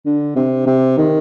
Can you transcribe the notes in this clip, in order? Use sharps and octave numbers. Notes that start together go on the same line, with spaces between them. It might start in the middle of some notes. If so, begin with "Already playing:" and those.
D3
C3
C3
D#3